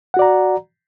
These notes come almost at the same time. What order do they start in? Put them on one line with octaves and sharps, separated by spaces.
F#5 F#4 D5 A#5